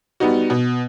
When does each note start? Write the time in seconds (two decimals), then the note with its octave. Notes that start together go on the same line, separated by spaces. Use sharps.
0.20 G3 B3 D#4 F#4
0.50 B2